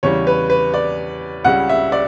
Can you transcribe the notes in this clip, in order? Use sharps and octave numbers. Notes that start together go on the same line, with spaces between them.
E2 C#3 G3 C#5
B4
B4
D5
C#2 C#3 G3 F#5
E5
D5